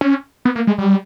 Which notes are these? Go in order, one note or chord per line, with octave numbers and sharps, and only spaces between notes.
C#4
B3
A#3
G#3
G3